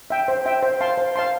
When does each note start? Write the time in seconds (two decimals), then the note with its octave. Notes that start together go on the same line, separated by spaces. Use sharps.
0.10 E5 G5
0.28 C5
0.46 E5 G5
0.63 C5
0.81 F5 A5 C6
0.98 C5
1.16 F5 A5 C6